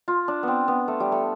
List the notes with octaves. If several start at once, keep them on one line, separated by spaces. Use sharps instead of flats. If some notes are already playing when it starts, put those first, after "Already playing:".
F4
D4
B3 C4
B3
A3
G3
A3